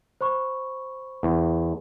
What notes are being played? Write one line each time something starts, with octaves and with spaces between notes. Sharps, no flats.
C5 B5 C#6
E2